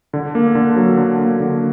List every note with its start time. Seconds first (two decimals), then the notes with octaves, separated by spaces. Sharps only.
0.13 D3
0.35 A#3
0.55 D3
0.76 F#3
0.97 D3
1.19 A#3
1.40 D3